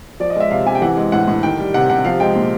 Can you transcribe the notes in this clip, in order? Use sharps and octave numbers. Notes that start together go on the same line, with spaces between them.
F3 D5
D#5
G#3 E5
C3 F5
C3 G#5
G5
E3 F#5
G#3
A2 F#5
A2
D#3 G5
G3
C3 F#5
C3 F#5
F3 F5
G#3 G5
A#2